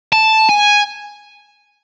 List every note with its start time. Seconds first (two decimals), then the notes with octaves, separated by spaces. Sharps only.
0.13 A5
0.49 G#5